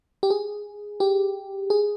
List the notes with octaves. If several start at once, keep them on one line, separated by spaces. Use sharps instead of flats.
G4
G#4
G4
G#4